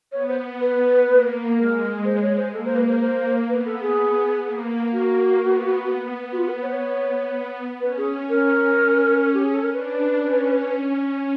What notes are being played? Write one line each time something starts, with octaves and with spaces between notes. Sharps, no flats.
B3 C#5
C5
B4
A#3
G#3 A#4
C5
C#5
C5
A#3 A4
C5
B4
C5
C5
B3 B4
A4
G#4
A#3
A#3 F#4
B3
B3
F#4
F4
B4
C#5
C5
C#5
C#4 B4
G#4
C#4 A#4
G4
G#4
A4
A#4
D4 B4
C#4